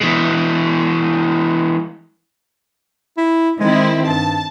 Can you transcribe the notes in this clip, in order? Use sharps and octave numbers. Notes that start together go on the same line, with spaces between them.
E3 G#3
E4
D#3 G#3 C4 E4
G2 A5